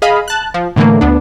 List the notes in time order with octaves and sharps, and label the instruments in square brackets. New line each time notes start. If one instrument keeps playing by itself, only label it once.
[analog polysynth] G#4 D#5 F5 B5
A5 F#6
F3
A2 D3 E3 A3 A#3
D2 B3 D4